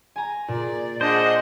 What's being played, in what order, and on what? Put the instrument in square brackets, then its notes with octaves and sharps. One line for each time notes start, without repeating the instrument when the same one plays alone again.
[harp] G#5 A#5
[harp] A#2 [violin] G#4 D5
[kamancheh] D4 D#5 [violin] G#4 F#5 [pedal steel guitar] C5